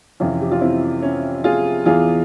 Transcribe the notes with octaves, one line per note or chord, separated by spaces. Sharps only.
F2 C3 E3 C#4 F4
G4
F4
C4 E4
C#4
F4 G#4
E2 E3 F4 G#4